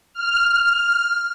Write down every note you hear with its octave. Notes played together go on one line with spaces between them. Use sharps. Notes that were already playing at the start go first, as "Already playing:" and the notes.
F6